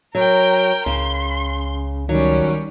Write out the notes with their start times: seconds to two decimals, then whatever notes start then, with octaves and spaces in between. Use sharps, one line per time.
0.15 F#3 A#4 G5
0.86 C#2 C#3 C6
2.09 D#3 F#3 G3 C#4